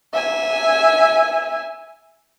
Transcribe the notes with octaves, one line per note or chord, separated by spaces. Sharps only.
E5 G#5